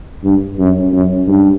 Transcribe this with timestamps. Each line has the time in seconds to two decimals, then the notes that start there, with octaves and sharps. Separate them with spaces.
0.24 G2
0.59 F#2
0.93 F#2
1.28 G2